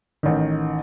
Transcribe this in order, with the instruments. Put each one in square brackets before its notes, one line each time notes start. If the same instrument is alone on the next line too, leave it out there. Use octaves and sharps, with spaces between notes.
[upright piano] A1 D#3